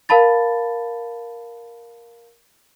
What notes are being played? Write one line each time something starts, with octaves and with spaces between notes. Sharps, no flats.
A#4 F5 A5 B5 A6